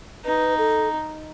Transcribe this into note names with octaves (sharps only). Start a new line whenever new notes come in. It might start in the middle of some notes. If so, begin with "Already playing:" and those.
D#4 B4
A4